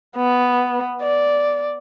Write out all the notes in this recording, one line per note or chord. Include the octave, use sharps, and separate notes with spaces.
B3
D5